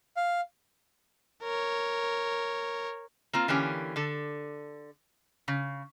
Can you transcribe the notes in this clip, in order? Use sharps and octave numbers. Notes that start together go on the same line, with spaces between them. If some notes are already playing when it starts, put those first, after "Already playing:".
F5
A#4 C#5
A#3 C4 F4
D3 E3 A#3 C#4 G4
D3 A4
C#3